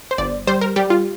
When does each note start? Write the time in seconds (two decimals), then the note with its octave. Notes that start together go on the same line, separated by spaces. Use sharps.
0.11 C5
0.18 G1 D5
0.47 G3 C5
0.61 A#4
0.76 G3 G4
0.90 F4